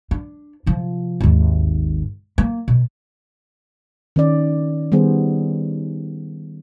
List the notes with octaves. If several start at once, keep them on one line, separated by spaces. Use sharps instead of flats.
D4
C3 F3
G#1 D#2
A#3
B2
D#3 C#4 D5
D#3 G3 B3 G#4 C5